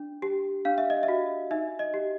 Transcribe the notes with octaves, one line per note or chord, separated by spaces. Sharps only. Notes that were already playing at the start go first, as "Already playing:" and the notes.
Already playing: D4
G4
D4 F5
E5
D#5
E5
F#4
D#4 E5
D#5
G4